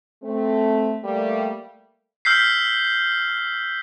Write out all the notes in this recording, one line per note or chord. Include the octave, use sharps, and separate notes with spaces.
A3 C4
G3 A3 A#3
E6 F6 G6 B6 C7